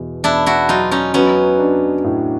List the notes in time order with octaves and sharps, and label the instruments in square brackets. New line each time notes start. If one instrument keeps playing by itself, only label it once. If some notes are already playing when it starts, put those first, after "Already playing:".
Already playing: [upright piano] E2 B2
[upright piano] E2 [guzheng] D4 E4
[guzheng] E4 F#4
[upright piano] F#3 [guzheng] D#4 F4
[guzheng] C#4 D#4
[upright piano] F#3 [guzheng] B3 C#4
[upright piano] D4
A2